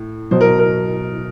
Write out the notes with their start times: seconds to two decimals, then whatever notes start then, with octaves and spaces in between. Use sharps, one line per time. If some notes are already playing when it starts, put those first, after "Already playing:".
Already playing: A2
0.31 B2 F#3 C5
0.41 A#4
0.59 A#4